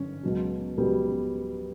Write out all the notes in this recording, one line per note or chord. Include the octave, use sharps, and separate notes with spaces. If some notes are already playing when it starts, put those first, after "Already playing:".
Already playing: G1 C#4
C#2 B2 F#3
C#2 B2 F#3 G3 B3